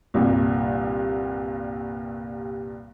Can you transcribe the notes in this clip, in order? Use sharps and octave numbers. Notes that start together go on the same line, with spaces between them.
C2 G2 A#2